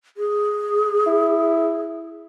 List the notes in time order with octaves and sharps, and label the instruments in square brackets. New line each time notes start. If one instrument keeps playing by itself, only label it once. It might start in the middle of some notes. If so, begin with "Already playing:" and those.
[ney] G#4
[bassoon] E4